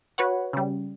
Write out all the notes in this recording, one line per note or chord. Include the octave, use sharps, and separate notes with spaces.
F#4 B4 C#5 F#5
C#3 G3